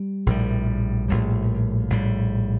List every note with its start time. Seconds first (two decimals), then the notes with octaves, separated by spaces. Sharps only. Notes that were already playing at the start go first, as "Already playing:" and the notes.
Already playing: G3
0.26 A#1 A2 G3
1.08 A#1 A2 G3
1.90 A#1 A2 G3